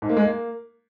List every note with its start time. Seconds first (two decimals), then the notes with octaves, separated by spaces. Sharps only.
0.02 G#2
0.09 A#3
0.17 G#3
0.24 A#3